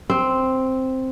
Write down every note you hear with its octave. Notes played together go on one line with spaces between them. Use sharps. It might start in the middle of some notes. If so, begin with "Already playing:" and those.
C4